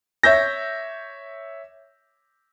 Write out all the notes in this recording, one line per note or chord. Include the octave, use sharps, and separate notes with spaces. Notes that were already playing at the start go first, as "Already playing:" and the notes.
C#5 E5 G6 A#6